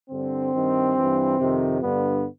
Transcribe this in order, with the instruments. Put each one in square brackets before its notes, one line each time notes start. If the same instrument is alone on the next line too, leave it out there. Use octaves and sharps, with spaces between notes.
[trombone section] G2 D3 C4
G2 D#3
G2 E3
F2 C3 D#3
G2 D3 B3